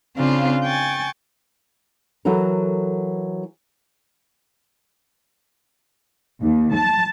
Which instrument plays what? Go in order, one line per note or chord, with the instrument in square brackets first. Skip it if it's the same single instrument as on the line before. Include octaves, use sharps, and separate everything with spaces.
[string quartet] C#3 C4 D4 F4 F5
G5 G#5 C#6 A6
[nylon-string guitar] E3 F#3 F#4 A4 A#4
[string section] D#2
A5